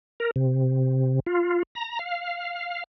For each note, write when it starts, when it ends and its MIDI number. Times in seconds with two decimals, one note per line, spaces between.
0.20 0.31 70
0.36 1.20 48
1.26 1.63 65
1.75 1.99 82
1.99 2.84 77